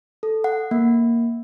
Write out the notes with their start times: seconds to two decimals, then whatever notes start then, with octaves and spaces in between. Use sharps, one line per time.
0.23 A4
0.44 F#5
0.71 A#3